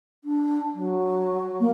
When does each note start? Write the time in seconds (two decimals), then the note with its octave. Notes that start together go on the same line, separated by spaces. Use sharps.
0.24 D4
0.74 F#3
1.60 A#3